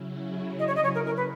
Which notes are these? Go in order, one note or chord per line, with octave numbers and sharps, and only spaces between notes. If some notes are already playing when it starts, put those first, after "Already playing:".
Already playing: C#3 F#3 C#4 E4
D#5
C#5
D#5
C#5
A#4
A#4
B4